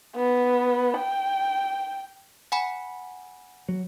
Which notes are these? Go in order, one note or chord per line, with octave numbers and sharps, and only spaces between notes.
B3
G5
F#5 G#5 B5
F#3